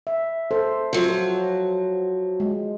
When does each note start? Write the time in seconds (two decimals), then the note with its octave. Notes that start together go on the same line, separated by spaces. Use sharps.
0.07 E5
0.51 A4 C5
0.93 F3 F#3
2.40 G#3